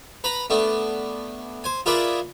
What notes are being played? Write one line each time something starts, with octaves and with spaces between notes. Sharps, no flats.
B4 A#5 B5
A3 B3 D4
C5 G#5
F4 G#4 A#4 B4 D5 E5